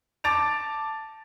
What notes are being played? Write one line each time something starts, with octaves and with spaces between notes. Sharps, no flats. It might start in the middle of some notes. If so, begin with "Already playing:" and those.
A5 D6 A6 D7 F7